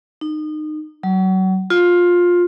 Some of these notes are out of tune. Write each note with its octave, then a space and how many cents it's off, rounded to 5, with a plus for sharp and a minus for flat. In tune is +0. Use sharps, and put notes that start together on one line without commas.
D#4 -25
F#3 +30
F4 +15